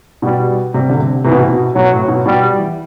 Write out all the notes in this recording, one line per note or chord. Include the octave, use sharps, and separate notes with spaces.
B2 G3
C3 G3
D3
C3
C3 E3
B2
C3
B2
B2 F#3
A2
B2
B2 G3
E3